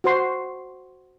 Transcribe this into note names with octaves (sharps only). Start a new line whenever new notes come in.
F#4 C5 C6